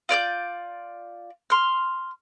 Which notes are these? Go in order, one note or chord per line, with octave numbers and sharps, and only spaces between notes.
F4 D5 F6 G6
C6 F6